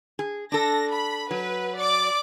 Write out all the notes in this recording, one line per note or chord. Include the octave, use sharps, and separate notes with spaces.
G#4
D4 A4 A#6
B5
F#3 B4
D5 D6